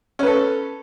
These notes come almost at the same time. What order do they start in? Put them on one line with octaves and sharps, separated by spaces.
C#4 B4 A4